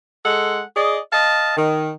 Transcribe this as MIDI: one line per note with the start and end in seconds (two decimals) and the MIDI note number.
0.24 0.61 56
0.24 0.61 69
0.24 0.61 78
0.75 0.98 68
0.75 0.98 74
0.75 0.98 75
1.12 1.55 75
1.12 1.55 77
1.12 1.55 81
1.57 1.91 51